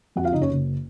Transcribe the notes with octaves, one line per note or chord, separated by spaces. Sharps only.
F2 F#4 F#5
F4 F5
F#1 D#4 D#5
C#4 C#5
F#1